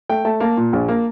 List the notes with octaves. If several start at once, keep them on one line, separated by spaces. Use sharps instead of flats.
A3 G5
A3 A5
A#3 A5
A#2
A#1
A#3